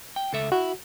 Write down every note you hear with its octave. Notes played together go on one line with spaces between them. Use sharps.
G5
C#2 A4 E5
E4 F#4